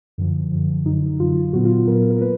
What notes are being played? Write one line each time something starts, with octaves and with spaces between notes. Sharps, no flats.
F#2 D3 F3
F#2 D3 F3
F#2 D3 F#3 D#4
F#2 D3 F#3 F4
A#2 F#3 B3 F#4
F4
A#2 F#3 B3 A#4
A#4
A#3 B4